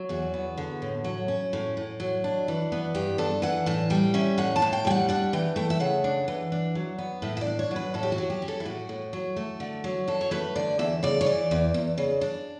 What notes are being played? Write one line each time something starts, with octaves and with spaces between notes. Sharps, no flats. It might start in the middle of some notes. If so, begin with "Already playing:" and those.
Already playing: F#3
E2 F#4
B3
D3
A2
F#3
C#4
A2
A2
F#3
D4
E3
B3
G2 G4
D4 A4
E3 F#5
A2 A5
G3 G5
C#4 E5
A2 F#5
A5
A2
G5
G3 G5
F#5
D4 F#5
E3 G5
A3 G5
E5
C#3 F#5
D4
E3
D4
F#3
B3
A2 E5
E5
D5
D4
C#5
F#3
B4
A2 A4
G4
F#4
F#3
G4
C#4
A4
E4
A2 F#4
A2
F#3
A3
D3
F#3
F#2 A4
C#5
A3 B4
D3 D5
E2 E5
C#3 D5
C#5
E3 D5
E2
E2
C#3
D4